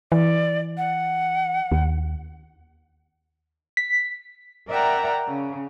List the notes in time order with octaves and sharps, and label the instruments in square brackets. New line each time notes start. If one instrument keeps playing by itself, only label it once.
[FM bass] E3 [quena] D5
[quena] F#5
[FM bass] D#2
[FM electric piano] B6
[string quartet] A#4 D5 E5 F#5 G5 A#5
C#3